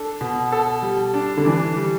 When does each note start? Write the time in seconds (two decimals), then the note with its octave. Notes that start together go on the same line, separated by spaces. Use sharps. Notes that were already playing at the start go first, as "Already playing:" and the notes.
Already playing: D4 A4
0.21 B2
0.52 A4
0.82 G3
1.14 D4
1.37 D3
1.45 E3 D4
1.76 G3